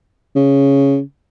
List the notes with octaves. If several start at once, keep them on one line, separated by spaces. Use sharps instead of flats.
C#3